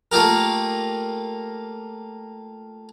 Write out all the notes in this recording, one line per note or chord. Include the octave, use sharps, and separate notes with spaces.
A3 A#3 F4 G4 A#4